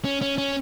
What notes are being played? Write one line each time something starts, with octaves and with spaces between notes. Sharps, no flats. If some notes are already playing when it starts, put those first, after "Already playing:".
C#4
C#4
C#4